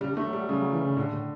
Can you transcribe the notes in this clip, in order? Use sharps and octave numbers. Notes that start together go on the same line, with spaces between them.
C#3 G3
D3
A3
F#3
G3
F#3
C#3 G3
F#3
E3
C#3
A2 D3
A2